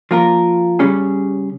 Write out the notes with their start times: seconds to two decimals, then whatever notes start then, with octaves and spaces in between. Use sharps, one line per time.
0.11 F3 A#3 F4 A#4
0.79 C#3 G3 C#4 G#4